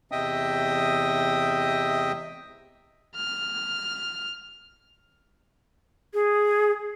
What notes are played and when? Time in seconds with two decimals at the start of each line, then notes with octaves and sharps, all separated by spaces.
0.12 E2 C3 D#5 E5 G5 D#6
3.15 F6
6.14 G#4